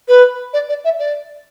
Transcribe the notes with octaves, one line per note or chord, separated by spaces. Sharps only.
B4
D5
D5
E5
D5